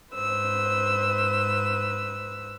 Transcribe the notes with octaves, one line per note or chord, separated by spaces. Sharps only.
G#2 B4 C5 E6